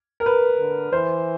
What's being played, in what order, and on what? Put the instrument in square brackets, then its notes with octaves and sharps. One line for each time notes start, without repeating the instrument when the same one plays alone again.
[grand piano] A#4
B4
[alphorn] D3
[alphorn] E3 [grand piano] C5